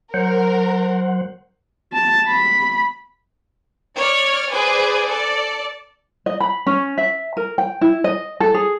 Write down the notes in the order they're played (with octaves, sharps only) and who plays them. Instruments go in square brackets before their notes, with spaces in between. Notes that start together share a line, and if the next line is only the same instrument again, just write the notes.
[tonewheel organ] F#3 C5 F#5 [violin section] A#4
[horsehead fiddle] A5
B5
[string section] C#5 D5 F6
G#4 B4 C5 D5 G#5
A4 D5
[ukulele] D#5
B5
C#4
E5
A#4
G5
E4
D#5
A4
G#4